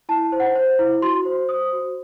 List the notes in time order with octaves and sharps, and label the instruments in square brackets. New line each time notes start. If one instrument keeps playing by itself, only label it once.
[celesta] E4 A5
C5
F#5
C5
E4
F#4 C6
C5
C5 D#6
F#4